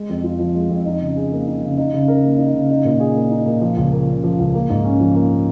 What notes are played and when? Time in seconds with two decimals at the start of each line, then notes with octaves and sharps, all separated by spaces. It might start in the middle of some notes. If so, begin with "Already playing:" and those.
Already playing: G#3
0.09 F2
0.24 F4
0.39 F3
0.55 G#3
0.70 F2
0.86 D#4
1.01 C#3
1.16 G#4
1.32 A#3
1.47 D#4
1.63 C#3
1.78 D#4
1.94 C#3
2.08 A#4
2.24 A#3
2.38 D#4
2.54 C#3
2.70 D#4
2.85 A#2
3.00 G#4
3.16 A#3
3.31 D#4
3.46 A#2
3.61 F3
3.77 C#2
3.92 A#3
4.07 C#3
4.24 F3
4.39 C#2
4.54 A#3
4.70 G#2
4.85 C#4
5.00 F3
5.15 A#3